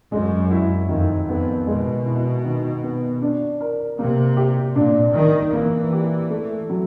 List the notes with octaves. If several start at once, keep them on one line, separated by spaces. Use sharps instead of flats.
F#2 G#3
E4
F2 D#3
F2 B3
B2 G#3
E4
D#3
B3
D4
A#4
C3 A#3
G4
A#2 D4
D#3 A#4
E3 A#3
G4
A3
F#3